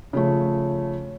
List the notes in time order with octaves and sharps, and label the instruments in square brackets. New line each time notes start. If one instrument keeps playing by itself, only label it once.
[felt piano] C#3 F3 A3